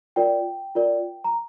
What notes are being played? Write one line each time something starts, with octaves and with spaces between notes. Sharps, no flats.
F4 A#4 D5 G5
F4 A#4 D5
A#5